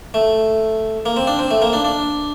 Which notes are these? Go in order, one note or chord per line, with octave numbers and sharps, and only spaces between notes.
A3
A#3
C4
D4
C4
A3
A#3
D4
D4